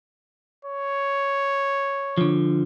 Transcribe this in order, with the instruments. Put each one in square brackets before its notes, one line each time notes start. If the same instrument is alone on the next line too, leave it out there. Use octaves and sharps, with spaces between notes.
[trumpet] C#5
[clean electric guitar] D3 F3